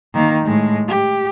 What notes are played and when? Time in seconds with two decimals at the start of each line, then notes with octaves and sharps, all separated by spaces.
0.14 D#3 A#3
0.45 A2 G#3
0.88 G4